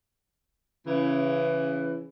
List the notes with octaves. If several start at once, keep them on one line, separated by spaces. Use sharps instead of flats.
C#3 E3